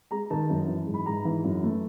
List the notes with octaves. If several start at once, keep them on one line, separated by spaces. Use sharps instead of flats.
G#3 A#5
D#3 A5
F#2
E3
G#2
B5
G#2 A#5
E3
F#2
A3